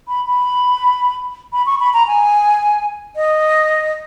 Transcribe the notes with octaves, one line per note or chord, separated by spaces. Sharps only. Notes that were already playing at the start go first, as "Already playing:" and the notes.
B5
B5
B5
C#6
B5
A#5
G#5
D#5